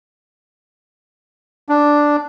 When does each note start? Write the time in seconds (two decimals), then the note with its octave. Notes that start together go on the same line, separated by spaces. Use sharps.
1.69 D4